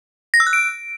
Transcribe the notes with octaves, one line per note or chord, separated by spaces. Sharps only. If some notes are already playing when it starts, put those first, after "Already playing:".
A#6
E6
F#6
D7